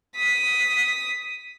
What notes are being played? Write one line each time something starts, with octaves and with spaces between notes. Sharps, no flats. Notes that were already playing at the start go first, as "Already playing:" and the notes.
D#6 B6